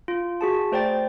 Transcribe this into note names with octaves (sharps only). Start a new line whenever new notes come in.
F4
F#4 G#4 A5
A3 C5 D5 G5 A6